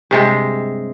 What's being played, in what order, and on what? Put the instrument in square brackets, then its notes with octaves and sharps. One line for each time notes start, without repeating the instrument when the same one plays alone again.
[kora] G2 C3 G#3